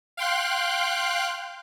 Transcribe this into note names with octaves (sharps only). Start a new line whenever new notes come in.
F5 G5 C6 F#6